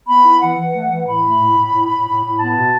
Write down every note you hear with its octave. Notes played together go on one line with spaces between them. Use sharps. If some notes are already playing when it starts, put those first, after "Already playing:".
B3 B5
E4
E3 F#5
E3
A3
E3
A2 B5
A3
A2
A2
A2
A2
A2
A2
B3 A5
B2